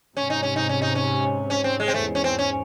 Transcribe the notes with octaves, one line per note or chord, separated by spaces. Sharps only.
G#2 C3 C#4
D#4
C#4
D#4
C#4
D#4
C#4
C#4
C4
G#3
C4
E2 G#2 A3
C#4
C4
C#4